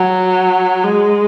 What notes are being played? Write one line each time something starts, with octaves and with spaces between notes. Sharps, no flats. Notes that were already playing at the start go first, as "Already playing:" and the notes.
Already playing: F#3
G#3